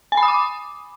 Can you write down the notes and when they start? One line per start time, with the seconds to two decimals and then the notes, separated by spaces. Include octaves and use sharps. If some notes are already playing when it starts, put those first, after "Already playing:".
0.12 G#5
0.17 B5
0.23 D#6
0.28 D6